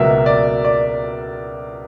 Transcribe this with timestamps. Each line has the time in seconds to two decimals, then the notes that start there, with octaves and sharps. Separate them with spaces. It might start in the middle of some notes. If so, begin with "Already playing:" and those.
Already playing: C#2 B2 F#3 A#3 E5
0.26 D5
0.65 D5